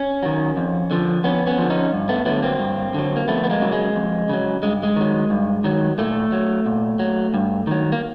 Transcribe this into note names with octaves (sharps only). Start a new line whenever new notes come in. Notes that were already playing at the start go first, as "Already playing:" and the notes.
Already playing: C#4
D#3 F#3
F2
D3 F3
F2 B3 C#4
B3 C#4
D3 F3
C#4 D#4
G2
A3 B3
D3 F#3 A3 B3
A#3 C4
G2
D3 F#3
A#3
F2 A3 B3
B3
G#3 A#3
C#3 F#3
G#3
F2
C#3 F#3
G2 G#3
G#3
D#3 F#3
G2
D#3 F#3
A#2 A3
F#3
A#2
F#3
G2
D#3 F#3
A#3